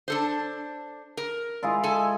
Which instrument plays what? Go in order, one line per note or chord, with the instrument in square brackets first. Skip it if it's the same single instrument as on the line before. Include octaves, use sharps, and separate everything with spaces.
[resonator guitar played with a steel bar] D4 A4 C5
A#4
[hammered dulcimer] G#3 E4 F4
[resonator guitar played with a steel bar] A4 G#5